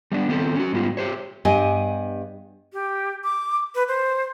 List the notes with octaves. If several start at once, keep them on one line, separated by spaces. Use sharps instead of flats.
G3 B3 D4
D#3 B3 C4 A4
C#4 F#4
G#2 G3 B3 F4
G4 C5 C#5
G2 B3 G4 D#5 G#5
G4
D6
B4
C5